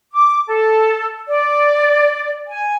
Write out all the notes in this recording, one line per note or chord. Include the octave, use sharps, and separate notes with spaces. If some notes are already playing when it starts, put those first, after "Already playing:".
D6
A4
D5
G#5